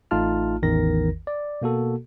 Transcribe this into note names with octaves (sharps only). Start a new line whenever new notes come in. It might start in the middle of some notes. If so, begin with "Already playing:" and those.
A1 A3 D#4 F4 A5 F6
A1 E2 D#3 A#4 A#6
D5
B2 A#3 F#4 A4